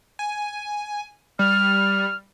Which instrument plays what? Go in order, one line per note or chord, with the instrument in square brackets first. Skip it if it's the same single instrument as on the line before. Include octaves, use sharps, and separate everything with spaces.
[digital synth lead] G#5
[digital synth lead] G3 [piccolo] F6